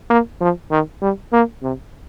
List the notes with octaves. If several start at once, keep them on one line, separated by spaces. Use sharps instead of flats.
A#3
F3
D#3
G3
A#3
C3